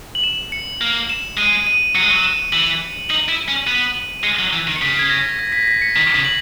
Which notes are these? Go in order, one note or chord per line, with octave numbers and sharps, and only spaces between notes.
F#7
E7
C#7
A#3
E7
G#3 D#7
D#7
F#3 C#7
G#3 D#7
F#3 C#7
E7
E3 F#7
D#4 F#7
E4
C#4
B3 D#7
D#7
G#3 C#7
F#3
E3
D#3
C#7
C#3 B6
G#6
A#6
A#6
B6
A#6
B6
C#7
D#3 B6
C#3
F#7